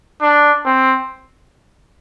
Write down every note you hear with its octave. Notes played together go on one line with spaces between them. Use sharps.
D4
C4